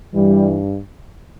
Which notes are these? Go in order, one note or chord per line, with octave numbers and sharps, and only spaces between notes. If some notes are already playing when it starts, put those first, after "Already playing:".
G2 E3 G3